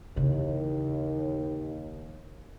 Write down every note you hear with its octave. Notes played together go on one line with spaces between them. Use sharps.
D#2 C#3 E3